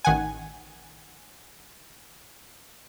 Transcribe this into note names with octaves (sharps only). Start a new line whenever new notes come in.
A1 D#3 F#5 G#5